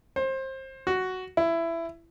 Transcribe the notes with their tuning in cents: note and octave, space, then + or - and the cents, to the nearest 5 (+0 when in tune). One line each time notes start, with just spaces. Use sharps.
C5 +25
F#4 +5
E4 +15